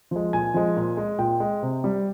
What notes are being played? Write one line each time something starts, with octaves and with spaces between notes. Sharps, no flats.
F3 G#3
A#2 G#5
F3 G#3
A#2
G#3
A#2 G5
G#3
C3
G3